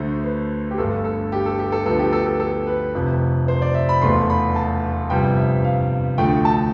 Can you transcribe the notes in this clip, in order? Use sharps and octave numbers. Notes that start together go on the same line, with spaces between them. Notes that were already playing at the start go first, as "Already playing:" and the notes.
Already playing: D2 D3 A3 C5
B4
G4
G1 G2 D3 A3 A4
A4
G4
A4
G4
A4
D2 D3 F3 B3 A4
G4
A4
A4
A4
B4
F1 F2 C3
C5
D5
E5
B5
E1 E2 B2 A3 C6
B5
A5
G1 F2 C3 G3 B3 G5
E5
F5
D2 D3 F3 A3 G5
A5